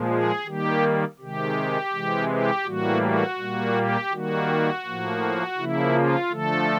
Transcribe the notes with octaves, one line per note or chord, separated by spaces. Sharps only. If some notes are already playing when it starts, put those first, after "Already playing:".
Already playing: A#2 F3 G#3
G#4
D#3 G3 A#3 G4
C3 D#3 G#3 G4
C3 E3 G#3
G4
A2 E3 G3 A#3 F#4
F#4
A#2 G3 A#3
G4
D#3 G3 A#3 F#4
A2 F3 A#3
C#3 F3 A#3 E4
F4
D3 F3 A3 A4